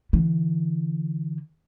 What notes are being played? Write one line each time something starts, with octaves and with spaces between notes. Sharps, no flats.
D3 E3